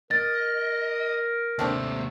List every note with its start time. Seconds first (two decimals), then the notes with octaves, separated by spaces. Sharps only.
0.11 A#4 D#5 A6
1.59 D#2 C3 A3 C4 D4